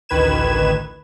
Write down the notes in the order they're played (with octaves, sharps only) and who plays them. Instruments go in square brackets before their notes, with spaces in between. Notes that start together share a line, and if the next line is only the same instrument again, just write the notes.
[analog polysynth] A1 D2 D#3 B4 G#6 E7